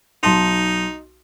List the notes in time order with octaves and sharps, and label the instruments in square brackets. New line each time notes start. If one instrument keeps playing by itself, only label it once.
[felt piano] B1 A5 C6 [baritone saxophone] D#4